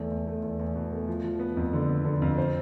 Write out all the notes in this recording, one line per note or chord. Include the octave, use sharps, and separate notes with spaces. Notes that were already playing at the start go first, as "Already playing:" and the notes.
Already playing: E2 A3
E2
A3
E2
E2
B2
A3
F3
F3
B3
F2
D3
B3
D3
F2
C5